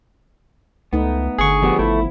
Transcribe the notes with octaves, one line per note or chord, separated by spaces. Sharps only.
C#2 A3 B3 D#4
G1 D3 G#4 F#5 C#6
F3 G3 B3 G4 F#5
G#1 A3 E4